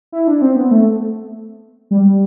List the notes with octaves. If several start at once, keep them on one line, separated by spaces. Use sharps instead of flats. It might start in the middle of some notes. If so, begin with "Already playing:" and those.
E4
D4
C4
B3
A3
G3